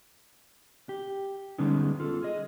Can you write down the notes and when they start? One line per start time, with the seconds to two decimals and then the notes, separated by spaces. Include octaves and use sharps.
0.89 G4
1.58 D3 G3 G#3 B3 C#4 D#4
2.00 F4 A4
2.23 G#4 D#5